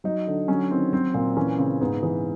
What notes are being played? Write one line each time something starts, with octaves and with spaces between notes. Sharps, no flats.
F#3 D#4
D3
F#3 C#4
D#3 C4
F#3 C4
A#2 C4
E3 C#4
C#3 C4
G#2 B3
E3